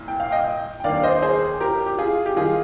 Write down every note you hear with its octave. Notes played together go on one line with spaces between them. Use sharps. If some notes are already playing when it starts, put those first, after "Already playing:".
Already playing: C2 A#2
G5
F5
D#5 G5
G5
D#2 D#3 A#3 D4 D5 F5
C5 D#5
G#4 C5
G4 A#4
G4
F4 G#4
G4
D#3 F4 G#4